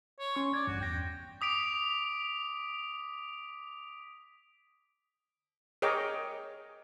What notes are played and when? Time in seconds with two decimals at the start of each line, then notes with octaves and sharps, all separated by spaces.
0.19 C#5
0.36 C#4 C6 C#6
0.54 D5 G#6
0.67 A1 G2 F#4
0.81 E2 G5 A#6
1.41 D6 D#6 B6 D7 F7
5.82 G#4 A#4 C#5 D#5 G5 D6